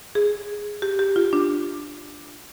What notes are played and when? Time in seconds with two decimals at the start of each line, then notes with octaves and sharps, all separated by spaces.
0.15 G#4
0.82 G4
0.99 G4
1.16 F4
1.33 D4